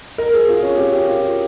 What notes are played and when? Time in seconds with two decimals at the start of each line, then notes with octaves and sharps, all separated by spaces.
0.18 A#4
0.34 G#4
0.49 F4
0.63 C#4
0.78 G4
1.08 F4